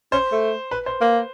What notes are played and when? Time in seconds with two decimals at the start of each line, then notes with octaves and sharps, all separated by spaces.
0.12 C#4 C5
0.32 A3
0.71 B4
0.86 C5
1.01 A#3